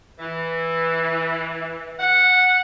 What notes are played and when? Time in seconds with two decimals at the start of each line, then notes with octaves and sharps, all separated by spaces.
0.19 E3
1.99 F#5